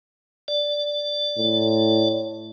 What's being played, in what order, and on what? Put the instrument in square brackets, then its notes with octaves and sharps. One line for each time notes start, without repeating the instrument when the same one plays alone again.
[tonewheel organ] D5
[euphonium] A2